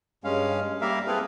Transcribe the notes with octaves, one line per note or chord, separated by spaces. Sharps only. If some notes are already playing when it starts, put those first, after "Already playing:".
G2 G#3 C#4 F5
G3 A#3 A#4 E5 F5
C4 E4 G#4 A4 B4 F5